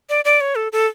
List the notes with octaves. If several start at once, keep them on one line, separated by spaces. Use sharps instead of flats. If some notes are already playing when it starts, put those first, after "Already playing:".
D5
D5
C#5
A4
A4